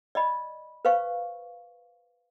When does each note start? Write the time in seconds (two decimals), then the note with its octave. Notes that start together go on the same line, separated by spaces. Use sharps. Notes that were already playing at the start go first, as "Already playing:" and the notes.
0.15 D5 D#5 B5
0.85 B4 C5 F5 C#6